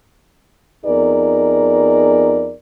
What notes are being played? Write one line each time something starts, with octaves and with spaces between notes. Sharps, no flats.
F2 B3 D#4 G#4 A#4 D5